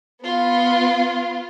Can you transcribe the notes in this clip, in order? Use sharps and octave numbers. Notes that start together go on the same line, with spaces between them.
B3 F4